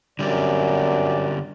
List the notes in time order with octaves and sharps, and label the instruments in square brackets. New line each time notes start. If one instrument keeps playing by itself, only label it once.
[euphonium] F#2 [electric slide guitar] D3 G3 C4 [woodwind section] D5